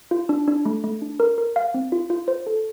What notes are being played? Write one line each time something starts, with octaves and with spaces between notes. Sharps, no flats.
F4
D4
D4
A3
A3
D4
A#4
A#4
F5
C4
F4
F4
C5
A4